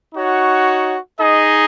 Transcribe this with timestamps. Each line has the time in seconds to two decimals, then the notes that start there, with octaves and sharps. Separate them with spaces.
0.13 D#4 F#4 C#5
1.18 D#4 G#4 D#5